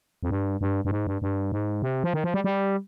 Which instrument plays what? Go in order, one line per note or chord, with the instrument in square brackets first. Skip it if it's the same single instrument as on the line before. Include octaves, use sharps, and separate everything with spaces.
[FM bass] F2
G2
G2
G2
G#2
G2
G2
G#2
C3
F3
D#3
F3
G3
G3